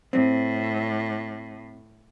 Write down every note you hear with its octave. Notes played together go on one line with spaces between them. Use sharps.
A2 C4